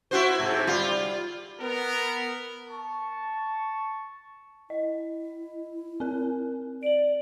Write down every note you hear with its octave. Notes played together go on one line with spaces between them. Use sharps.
E4 F#4 C5
G#2 C3
G3 F4
B3 A#4
A5 C#6
E4 D#5
C4 A#4
D5 D7 F#7